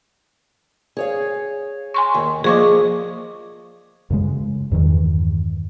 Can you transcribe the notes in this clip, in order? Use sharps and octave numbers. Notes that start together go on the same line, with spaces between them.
G#4 C#5 F5
G#5 C6 C#6
D#2
F3 A#3 G#4 D#5 C#6 D6
F#2 C#3 G#3
E2 G2 D#3 E3